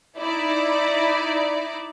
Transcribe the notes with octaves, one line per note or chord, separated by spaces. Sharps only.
D#4 E4 D5